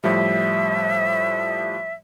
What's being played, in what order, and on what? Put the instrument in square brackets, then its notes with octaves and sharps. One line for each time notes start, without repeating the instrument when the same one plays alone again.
[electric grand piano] A2 F3 G3 [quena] E5